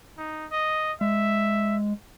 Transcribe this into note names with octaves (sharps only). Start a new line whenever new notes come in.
D#4
D#5
G#3 E5